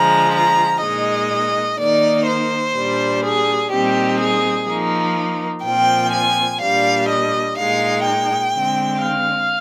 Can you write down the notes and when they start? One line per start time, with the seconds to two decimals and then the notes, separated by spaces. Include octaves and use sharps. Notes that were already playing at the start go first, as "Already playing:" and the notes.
Already playing: D3 F3 G#3 A#5
0.34 A#5
0.81 A#2 G#3 D#4 D#5
1.78 D#3 A#3 D#4 D5
2.27 C5
2.75 A#2 G3 D4
3.23 G#4
3.70 A#2 G3 C4 D#4 G4
4.19 G#4
4.67 F3 A#3 D#4
5.64 A#2 F3 C4 G5
6.12 G#5
6.60 A#2 G3 D4 F5
7.08 D#5
7.57 A#2 G#3 D#4 F5
8.04 G5
8.53 D3 G#3 C4
9.00 F5